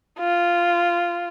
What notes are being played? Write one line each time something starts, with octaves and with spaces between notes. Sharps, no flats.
F4